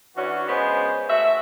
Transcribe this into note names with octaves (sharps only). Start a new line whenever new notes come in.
E3 C#4 D4 F#4
C#3 G#3 B3 G#4 C5
A3 F#4 E5